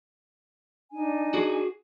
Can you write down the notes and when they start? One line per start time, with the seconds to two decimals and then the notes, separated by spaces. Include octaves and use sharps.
0.92 D4 D#4 G#5
1.34 F#4 G#4